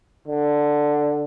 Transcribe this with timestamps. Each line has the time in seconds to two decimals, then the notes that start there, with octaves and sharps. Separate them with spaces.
0.28 D3